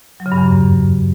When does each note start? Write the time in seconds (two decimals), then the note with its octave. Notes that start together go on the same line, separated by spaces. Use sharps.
0.20 F#3
0.26 C#3
0.32 G2
0.37 E2
0.43 F#2